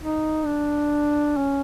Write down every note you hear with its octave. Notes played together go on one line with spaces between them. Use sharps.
D#4
D4
C#4